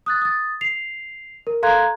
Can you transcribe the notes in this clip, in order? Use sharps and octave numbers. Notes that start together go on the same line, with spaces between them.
D#6 F#6 A6
D#6 A6
C7 F7
A#4
A4 F5 A#5 C6 F#6 G#6